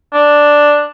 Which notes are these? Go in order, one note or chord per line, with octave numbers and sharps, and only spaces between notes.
D4